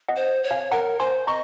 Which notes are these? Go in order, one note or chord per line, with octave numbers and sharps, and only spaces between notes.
D#5 F#5
C5
C#5
F5 G#5
A#4 F#5 A#5
C5 G#5 C6
D#5 A#5 C#6